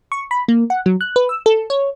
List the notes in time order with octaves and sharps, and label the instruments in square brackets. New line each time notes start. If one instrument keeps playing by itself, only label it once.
[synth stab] C#6
B5
A#3
F#5
F#3
F#6
B4
E6
A4
C#5